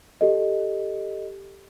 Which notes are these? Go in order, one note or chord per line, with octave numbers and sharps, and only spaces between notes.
G4 A4 D#5